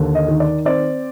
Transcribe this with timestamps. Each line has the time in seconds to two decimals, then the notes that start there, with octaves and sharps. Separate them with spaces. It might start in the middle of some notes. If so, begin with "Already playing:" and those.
Already playing: D#2 D3
0.15 D#5
0.28 D#3
0.40 D5
0.65 C4 D5